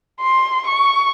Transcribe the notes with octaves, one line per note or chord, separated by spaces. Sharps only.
C6
C#6